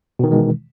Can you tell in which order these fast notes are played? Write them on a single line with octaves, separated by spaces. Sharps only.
B2 D#3 E3 G#3